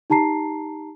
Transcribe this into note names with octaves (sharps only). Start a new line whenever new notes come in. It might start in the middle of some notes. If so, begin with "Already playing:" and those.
D#4 G4 A5 A#5 C7